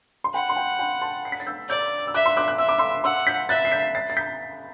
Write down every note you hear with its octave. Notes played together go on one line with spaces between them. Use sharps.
C6
F#5 G5 B5
C6
G5 B5
G5 B5
A5 C6
C7
B6
A6
E6 G6
D5 E6 G6
E6
E5 D6 F#6
C6 E6
D6 F#6
F#6
E5 E6
D6
C6 E6
F#5 C6 E6
G6 B6
E5 F#6 A6
C7
G6 B6
A6 C7
A6
G6 B6